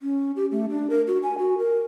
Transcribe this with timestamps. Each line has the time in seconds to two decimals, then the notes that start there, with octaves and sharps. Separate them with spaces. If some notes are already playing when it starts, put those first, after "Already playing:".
0.01 C#4
0.36 G4
0.52 A3
0.69 D4
0.90 A#4
1.07 F#4
1.23 G#5
1.38 F#4
1.58 A#4